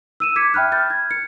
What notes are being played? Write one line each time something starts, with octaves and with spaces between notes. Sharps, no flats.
E6 D#7 E7
D6 G#6 B6 C#7
E5 G5 B5 F6 F#6
B5 F6 G6 A6
G#6
C#7